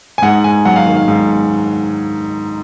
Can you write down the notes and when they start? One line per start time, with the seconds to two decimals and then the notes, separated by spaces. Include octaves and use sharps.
0.18 G#5
0.22 G#2 F#5
0.44 G#2 G#5
0.65 F#3 F#5
0.76 F5
0.86 D#3
0.97 F5
1.08 G#2